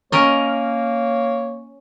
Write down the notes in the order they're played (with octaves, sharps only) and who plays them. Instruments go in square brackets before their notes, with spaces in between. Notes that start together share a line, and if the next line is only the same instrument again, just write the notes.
[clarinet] A#3 [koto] C#4 A#4 D#5 [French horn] C#5